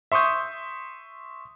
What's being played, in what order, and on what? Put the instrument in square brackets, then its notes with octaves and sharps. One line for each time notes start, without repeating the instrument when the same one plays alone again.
[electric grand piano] E5 C6 C#6 D#6 G6